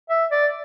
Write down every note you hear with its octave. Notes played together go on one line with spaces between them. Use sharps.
E5
D5